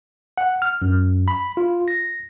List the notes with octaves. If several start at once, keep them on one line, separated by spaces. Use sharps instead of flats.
F#5
F6
F#2
B5
F4
A#6